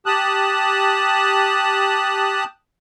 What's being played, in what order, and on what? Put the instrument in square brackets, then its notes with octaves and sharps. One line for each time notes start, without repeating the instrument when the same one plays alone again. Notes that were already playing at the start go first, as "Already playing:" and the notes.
[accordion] G4 A5 D#6 F#6